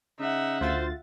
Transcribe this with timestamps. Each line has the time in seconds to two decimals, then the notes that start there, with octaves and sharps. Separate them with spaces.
0.19 C#3 D#4 E5 F#5
0.61 D2 F4 C5 A6